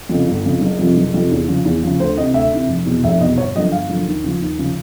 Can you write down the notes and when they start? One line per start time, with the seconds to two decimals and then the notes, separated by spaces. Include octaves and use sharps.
0.09 F2 C#3
0.27 G1
0.45 F2 C#3
0.61 F#1
0.79 F2 C3 F3
0.96 F#1
1.14 F2 C3 F3
1.31 E2
1.48 C#3 F3
1.65 E2
1.83 C#3 F3
2.00 D2 C5
2.17 C3 E3 D#5
2.34 D2 E5
2.52 C3 E3
2.68 F1
2.86 E2 B2
3.04 F1 E5
3.20 B2 D#5
3.24 E2
3.38 G1 C#5
3.55 F#2 D3 F3 D#5
3.72 G1 F5
3.89 F#2 D3 F3
4.07 D#2
4.24 C#3 F3
4.41 D#2
4.58 C#3 F3